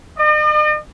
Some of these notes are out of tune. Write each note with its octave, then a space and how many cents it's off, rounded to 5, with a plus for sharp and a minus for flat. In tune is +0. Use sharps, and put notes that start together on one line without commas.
D#5 -45